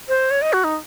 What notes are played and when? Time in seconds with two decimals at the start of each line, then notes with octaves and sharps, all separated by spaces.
0.08 C5
0.31 C#5
0.42 D#5
0.53 F#4
0.64 D#4